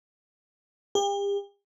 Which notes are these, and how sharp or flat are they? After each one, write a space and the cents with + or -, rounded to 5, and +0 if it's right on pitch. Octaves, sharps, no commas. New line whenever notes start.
G4 +40